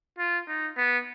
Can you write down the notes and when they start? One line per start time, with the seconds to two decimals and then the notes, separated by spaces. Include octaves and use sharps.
0.18 F4
0.48 D#4
0.77 B3